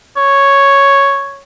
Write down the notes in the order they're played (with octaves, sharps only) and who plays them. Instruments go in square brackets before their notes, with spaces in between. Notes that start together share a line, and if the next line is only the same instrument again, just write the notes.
[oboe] C#5